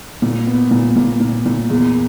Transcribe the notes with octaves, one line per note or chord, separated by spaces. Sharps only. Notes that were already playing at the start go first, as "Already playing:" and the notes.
A#2
B3
A#2
A#2
A#2
A#2
E2